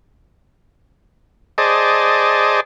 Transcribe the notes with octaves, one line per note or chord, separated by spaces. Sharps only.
G#4 C5 D5 D#5 A5